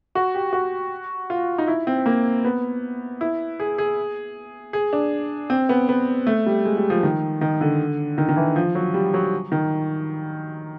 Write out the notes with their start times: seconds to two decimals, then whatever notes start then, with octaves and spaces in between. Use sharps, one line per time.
0.15 F#4
0.35 G4
0.53 F#4
1.30 F4
1.58 D#4
1.68 E4
1.87 C4
2.06 A#3
2.44 B3
3.21 E4
3.60 G#4
3.78 G#4
4.73 G#4
4.93 D4
5.50 C4
5.69 B3
5.89 B3
6.27 A3
6.46 G3
6.65 G#3
6.77 G3
6.90 F3
7.03 D#3
7.41 D#3
7.61 D3
8.18 D#3
8.29 D#3
8.37 E3
8.56 F3
8.75 F#3
8.94 G3
9.14 F#3
9.52 D#3